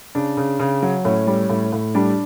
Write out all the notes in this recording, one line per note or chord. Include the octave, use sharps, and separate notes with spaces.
C#3 D4
C#3
C#3
F#3
A2 C#4
G3
A2
A2
G3 D4